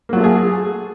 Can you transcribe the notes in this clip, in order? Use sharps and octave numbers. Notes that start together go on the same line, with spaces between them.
F#3 A3 A#3 F4 G#4